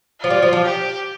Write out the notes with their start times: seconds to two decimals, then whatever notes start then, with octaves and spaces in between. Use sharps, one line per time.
0.20 F3 F4
0.30 G3
0.42 F3
0.53 F3
0.65 G4